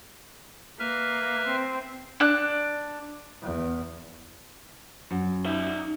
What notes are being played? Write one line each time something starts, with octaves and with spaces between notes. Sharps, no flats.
A#3 B4 E5 F6
C4
D4 F#6
E2
F#2
D#4 E5